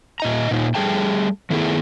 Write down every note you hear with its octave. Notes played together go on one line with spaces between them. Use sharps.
A#2 D#5 A#5
A#2 D#4
G3 A3 G#4 G5 A5
D#3 A3 B3 E4 G4 G#4